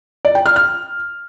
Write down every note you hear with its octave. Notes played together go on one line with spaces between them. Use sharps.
D5
G5
F6
F6